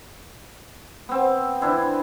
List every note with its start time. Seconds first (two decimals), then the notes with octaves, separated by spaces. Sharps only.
1.09 B3 C4
1.61 E3 D4 E4 C5